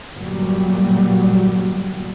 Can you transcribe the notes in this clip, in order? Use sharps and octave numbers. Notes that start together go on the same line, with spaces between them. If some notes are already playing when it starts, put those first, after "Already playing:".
G1 A#2 F#3 G3